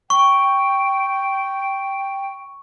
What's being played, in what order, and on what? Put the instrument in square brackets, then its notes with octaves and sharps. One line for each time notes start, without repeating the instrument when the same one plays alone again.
[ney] G5 [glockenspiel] C#6